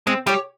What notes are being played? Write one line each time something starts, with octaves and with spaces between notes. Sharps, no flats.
G#3 C4
G3 G4 C#5